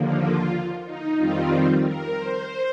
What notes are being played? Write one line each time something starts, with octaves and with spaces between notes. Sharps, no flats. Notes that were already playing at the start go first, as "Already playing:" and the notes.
Already playing: D#2 D3 F3 A#3
F4
D#4
F2 D#3 G3 C4 F4
A#4
C5